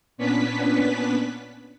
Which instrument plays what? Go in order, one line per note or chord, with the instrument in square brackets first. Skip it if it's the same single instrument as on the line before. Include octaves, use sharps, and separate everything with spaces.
[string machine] A#2 B3 C#4 D4 B4 B6